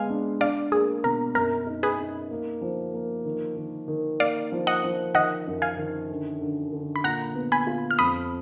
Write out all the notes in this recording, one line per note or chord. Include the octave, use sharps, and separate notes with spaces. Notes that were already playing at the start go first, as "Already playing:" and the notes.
Already playing: G#3 B3 F5 G#5
D4
D4 D5 F5
A#3 G#4
B2 A#4
F#2 A#4
D#4
G#4 B4
D#4
A#3
F3
A#3
D#3
D#3
D#3
A#3 D5 F5
F3
D#5 F#5
F3
D#3 D#5 F#5
F#2
F5 G#5
D#3
D3
D3
D3
B5
A#2 F#5 A#5
B3
G#5 B5
F4
F6
F2 B5 D#6